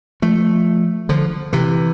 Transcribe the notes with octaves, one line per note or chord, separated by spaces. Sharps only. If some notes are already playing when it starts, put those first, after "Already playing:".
F3 A3
D3 F3
C3 E3